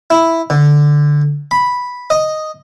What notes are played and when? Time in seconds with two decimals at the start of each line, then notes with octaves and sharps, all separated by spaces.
0.10 E4
0.50 D3
1.51 B5
2.10 D#5